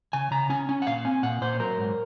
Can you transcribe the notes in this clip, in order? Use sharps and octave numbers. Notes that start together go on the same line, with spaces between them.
C#3 G#5
C#3 A#5
C#4 G#5
C#4 G#5
F#5
A#2 F5
C4 G#5
A#2 F#5
A#2 C5
F#3 A#4
G#2